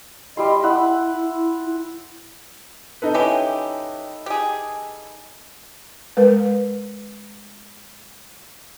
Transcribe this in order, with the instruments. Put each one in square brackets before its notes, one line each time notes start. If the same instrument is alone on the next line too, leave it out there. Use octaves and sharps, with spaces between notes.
[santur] G3 E4 C6 [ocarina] D#5
[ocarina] E4 [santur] E5 F#5 E6
[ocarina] E4
[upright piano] D#4 A4 B4
[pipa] E3 C#4 G4
G4 G#4
[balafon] G#3 A#4 B4